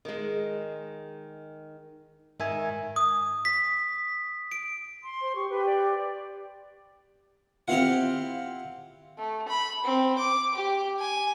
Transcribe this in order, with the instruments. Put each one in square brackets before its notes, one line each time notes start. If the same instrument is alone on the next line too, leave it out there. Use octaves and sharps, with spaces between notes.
[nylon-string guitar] D#3 G#3
[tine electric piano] G#2 E5 G#5 [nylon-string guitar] D#3
[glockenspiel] D#6
B6
D7
[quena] C6
[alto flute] C5
[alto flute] G4 [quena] C#6
[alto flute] G4 [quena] B4
[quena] D5
[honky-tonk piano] C4 E4 F4 [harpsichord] G4 F5 F#5
[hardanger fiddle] A3
B5
C4
D6
G4
G#5